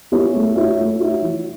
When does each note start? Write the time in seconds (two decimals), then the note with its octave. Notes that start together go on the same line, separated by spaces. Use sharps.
0.12 B3 E4 G#4 C#5
0.34 A3
0.56 D#4 F#4 C#5 E5
0.79 A3
1.00 D#4 F#4 C#5 E5
1.22 E3